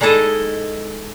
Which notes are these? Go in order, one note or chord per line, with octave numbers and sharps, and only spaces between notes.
G#3 D#4 E4 A4 D#5